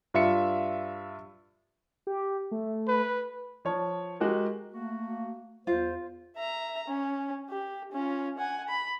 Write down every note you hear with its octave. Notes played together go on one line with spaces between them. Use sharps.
G2 F4 E5 C#7
G4
A3
B4
F3 C#5 A5
G#3 F#4 G4 A#4
A3 A#3 F#4
E2 F4 C5
E5 A#5
C#4
G4
C#4 F4
F#5 G#5
B5